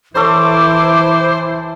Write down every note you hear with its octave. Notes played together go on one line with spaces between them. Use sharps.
E3 E4 A4 C5 C#5 C6 D6